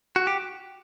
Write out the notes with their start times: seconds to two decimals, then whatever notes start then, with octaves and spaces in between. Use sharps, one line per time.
0.16 F#4
0.27 G4